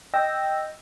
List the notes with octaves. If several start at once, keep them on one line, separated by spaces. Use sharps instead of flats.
D#5 G5 E6 A#6